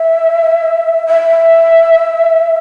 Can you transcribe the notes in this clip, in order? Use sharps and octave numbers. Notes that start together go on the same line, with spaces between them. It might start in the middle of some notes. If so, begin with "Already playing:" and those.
Already playing: E5
E5